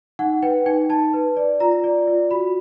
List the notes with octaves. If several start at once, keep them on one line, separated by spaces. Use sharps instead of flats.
D#4 F#5
B4 G5
D#4 G5
D#4 A5
B4
D5
F4 A#5
D5
F4
F#4 B5